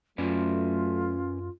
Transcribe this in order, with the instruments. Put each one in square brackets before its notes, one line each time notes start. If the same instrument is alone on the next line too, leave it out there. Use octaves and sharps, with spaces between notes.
[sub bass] F#2 [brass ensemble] F#3 A3 [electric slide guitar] C#4 B4 D5 [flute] F4